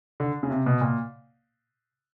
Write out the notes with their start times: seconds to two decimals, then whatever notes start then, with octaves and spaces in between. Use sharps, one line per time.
0.20 D3
0.43 C#3
0.50 C3
0.66 B2
0.81 A#2